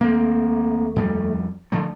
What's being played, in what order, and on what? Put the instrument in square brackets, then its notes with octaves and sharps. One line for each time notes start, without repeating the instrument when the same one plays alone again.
[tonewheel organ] D#2 A3 [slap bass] A#3 C4
[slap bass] F2 G3
D3 F3 A3